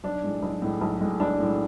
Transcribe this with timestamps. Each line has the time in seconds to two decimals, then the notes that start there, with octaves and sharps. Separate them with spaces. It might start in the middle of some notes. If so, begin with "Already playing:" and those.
0.04 B1 D4
0.24 A2 G#3
0.43 B1
0.62 A2 G#3
0.81 B1
1.01 A2 G#3
1.20 B1 D4
1.40 A2 G#3